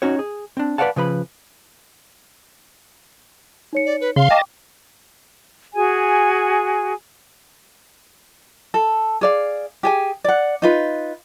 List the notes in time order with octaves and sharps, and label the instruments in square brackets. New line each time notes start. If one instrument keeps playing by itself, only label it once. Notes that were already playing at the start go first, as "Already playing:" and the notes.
[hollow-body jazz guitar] C#4 D#4 F#4 C#5
G#4
C4 D4
B4 C#5 D5 F5 F#5 A5
C#3 F3 B4 B5
[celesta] D#4 C#5 C#7
[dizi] D5
B4
[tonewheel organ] C#3 C6 [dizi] F5
[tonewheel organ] D#5 A5 [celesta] G5 C#6 D6
[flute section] F#4 G#4 G#5
[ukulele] A4
G#4 D5 F5
G4 G#4 G#5
D5 F#5
D#4 F4 B4